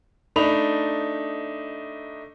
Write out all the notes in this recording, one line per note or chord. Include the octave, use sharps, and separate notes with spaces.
A3 D4 D#4 B5 F7